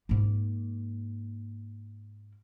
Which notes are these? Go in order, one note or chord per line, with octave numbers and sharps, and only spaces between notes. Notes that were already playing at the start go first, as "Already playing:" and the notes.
G#2 A#3